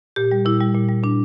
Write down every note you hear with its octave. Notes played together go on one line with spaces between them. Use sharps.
A#2 G4
G3
A#2 E4
G3
A#2
G3
A#2 D4